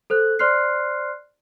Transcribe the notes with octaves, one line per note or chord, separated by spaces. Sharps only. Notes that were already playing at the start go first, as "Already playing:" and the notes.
A4 C5 F#6
C5 D5 C6 F6 F#6 C7